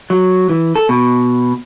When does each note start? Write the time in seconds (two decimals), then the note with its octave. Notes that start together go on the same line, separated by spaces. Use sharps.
0.10 F#3
0.49 E3
0.76 A4
0.89 B2